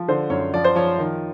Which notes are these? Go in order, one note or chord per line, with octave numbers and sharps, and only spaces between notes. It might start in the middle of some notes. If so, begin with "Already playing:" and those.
Already playing: F3
D3 C5
F#2 C#5
F3 D5
C5
F3 C#5
D#3